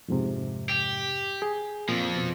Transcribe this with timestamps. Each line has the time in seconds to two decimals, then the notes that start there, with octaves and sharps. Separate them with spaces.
0.08 F2 G#2 C3
0.69 G4
1.42 G#4
1.89 F2 A#2 F3
2.16 B2